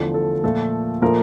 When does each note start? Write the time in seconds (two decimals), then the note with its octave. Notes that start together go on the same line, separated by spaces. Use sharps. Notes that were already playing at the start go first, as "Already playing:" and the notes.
Already playing: E2 D3 F3 A3
0.14 A4
0.44 A#2 F3 A3 A4
1.02 A#2 F3 A3 A#4